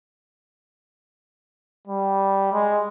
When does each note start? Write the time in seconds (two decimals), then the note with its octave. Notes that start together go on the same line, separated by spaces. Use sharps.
1.87 G3
2.52 G#3